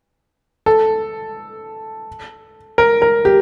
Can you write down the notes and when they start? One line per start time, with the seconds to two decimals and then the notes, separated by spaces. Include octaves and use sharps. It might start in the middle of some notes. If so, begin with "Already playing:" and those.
0.66 A4
2.78 A#4
3.02 A#4
3.25 G4